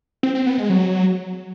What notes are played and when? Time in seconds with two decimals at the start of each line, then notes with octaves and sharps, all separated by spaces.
0.23 C4
0.35 C4
0.46 B3
0.58 G#3
0.69 F#3